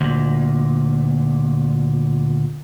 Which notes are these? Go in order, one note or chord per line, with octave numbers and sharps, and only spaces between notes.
D2 A#2